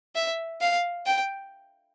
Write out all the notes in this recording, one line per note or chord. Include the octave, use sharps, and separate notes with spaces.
E5
F5
G5